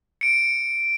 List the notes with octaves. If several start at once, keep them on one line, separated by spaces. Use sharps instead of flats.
C#7 D7